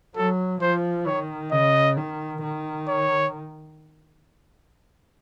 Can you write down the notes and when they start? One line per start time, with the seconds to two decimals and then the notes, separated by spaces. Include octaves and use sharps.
0.16 F#3 A4
0.61 F3 C5
1.06 D#3 C#5
1.52 C#3 D#5
1.97 D#3
2.43 D#3
2.88 C#5